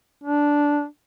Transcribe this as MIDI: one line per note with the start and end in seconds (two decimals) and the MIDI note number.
0.24 0.85 62